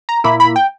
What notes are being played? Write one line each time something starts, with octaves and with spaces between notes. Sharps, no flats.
A#5
A#2 A#3 E4 B5
B5
G5